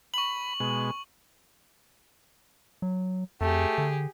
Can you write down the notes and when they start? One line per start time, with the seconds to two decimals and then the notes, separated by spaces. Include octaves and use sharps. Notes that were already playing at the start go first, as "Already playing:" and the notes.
0.14 B5 C#6 F#7
0.60 B2 G#3
2.82 F#3
3.41 F2 A3 G4 G#4
3.78 D3